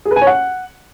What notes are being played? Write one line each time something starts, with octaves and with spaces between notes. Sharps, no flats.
G#4
B4
G#5
C#5
F#5